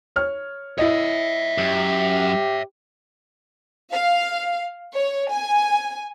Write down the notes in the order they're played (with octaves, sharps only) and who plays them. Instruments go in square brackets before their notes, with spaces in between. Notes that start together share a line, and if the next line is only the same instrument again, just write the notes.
[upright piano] C#5 F6
[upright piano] E4 D#5 [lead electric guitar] C#5 E5
[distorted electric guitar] F#2 [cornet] G4
[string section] F5
C#5
G#5